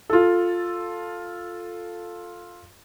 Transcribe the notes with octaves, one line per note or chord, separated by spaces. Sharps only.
F4 A4